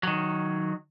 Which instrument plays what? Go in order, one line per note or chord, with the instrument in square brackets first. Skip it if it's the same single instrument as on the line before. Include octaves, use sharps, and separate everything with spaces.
[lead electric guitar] D#3 F#3